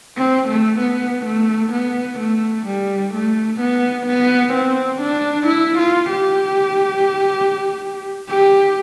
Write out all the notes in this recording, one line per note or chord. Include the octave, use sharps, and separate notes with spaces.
C4
A3
B3
A3
B3
A3
G3
A3
B3
B3
C4
D4
E4
F4
G4
G4